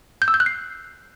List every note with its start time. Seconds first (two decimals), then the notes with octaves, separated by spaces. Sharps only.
0.22 G6
0.28 E6
0.34 G6
0.40 F#6
0.46 C7